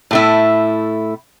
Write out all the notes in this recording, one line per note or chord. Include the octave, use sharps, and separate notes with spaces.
A2 A3 E4